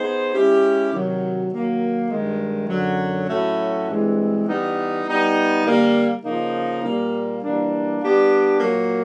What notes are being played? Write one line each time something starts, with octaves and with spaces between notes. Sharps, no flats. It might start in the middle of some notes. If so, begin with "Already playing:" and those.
Already playing: B3 D#4 G#4 C5
G#3 C#4 E4 G4
C3 D#3 F#3
D#3 F#3 A#3
G2 D#3 G#3
F#2 D3 F#3
A2 F#3 A3 C#4 F#4
G2 E3 G#3 C4
E3 G3 B3 D#4
G3 B3 D#4
D3 G3 A#3
C#3 F3 A#3 D#4
A#2 G3 A#3
E3 G3 A#3 D4
G3 B3 D4 G4
A#2 F#3 A#3